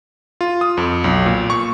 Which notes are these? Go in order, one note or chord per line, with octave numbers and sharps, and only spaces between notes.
F4
D#6
F2
B1
A#2
C#6